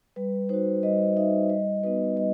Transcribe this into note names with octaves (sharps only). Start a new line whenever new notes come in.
G3 B4
D#4 F#4 C5
G3 D#5
D#4 F#4 E5
G3 D#5
B3 D#4 F#4 B4
G3 D#5